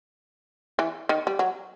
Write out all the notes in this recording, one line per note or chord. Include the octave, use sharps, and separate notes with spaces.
E3
D#3
G3
F#3